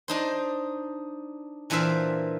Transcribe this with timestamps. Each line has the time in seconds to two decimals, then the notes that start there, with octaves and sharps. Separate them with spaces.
0.08 D4 D#4 C5
1.70 A#2 E3 D4 C5 E5 F5